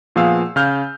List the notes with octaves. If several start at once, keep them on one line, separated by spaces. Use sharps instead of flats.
A#2 F3 B3 G#4 F5 E6
C#3 F5 F6 G6